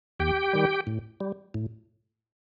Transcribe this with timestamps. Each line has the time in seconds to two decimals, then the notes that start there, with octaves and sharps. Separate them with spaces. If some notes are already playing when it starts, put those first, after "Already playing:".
0.20 D#2 G4 G5
0.53 D#3 G3
0.87 A2
1.20 G3
1.54 A2